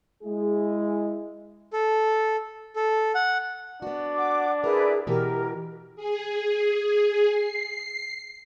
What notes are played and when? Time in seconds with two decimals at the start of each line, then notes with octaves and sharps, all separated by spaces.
0.23 G#3 E4 G#4
1.73 A4
2.76 A4
3.15 F#5
3.82 B3 D4 F#4
4.15 F#5 D6
4.64 E4 G#4 A#4 B4 D5
5.07 B2 E3 G4 A#4
5.96 G#4
7.26 C7